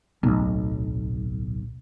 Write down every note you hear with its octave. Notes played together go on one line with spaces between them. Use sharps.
D1 B1